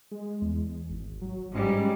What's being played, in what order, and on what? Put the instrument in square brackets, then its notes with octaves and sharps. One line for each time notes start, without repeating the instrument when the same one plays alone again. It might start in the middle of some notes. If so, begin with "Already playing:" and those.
[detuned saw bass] G#3
E2
G#1
F#3
[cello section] G#2 G3 G#3 [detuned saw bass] C#4